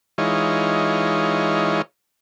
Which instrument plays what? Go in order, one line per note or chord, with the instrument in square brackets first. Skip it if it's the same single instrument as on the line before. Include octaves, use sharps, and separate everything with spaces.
[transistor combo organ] E3 G#3 D#4 F4 C#5